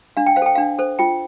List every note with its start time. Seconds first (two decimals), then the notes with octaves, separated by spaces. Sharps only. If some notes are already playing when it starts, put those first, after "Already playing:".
0.17 D4 F5
0.26 G5
0.36 C5 F5
0.42 A4 G5
0.55 D4 F5
0.79 A4 C5
0.99 F4 G5